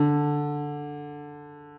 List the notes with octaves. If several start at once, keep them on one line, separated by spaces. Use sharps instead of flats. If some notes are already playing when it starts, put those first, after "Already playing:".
Already playing: D3